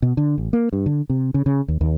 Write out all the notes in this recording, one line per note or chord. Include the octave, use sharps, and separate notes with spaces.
B2
D3
A1
A#3
G2
D3
C3
C#3
C#3
D#2
D#2